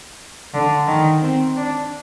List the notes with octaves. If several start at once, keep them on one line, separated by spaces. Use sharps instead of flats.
D3
D#3
C4
D4